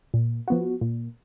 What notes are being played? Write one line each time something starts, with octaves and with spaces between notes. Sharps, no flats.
A#2
F3 B3 F#4
A#2